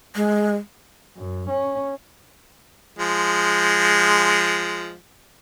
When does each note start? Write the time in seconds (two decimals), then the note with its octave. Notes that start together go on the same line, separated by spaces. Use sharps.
0.15 G#3
1.17 F#2
1.50 C#4
2.99 F3 G#3